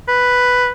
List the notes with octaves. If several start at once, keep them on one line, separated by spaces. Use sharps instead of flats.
B4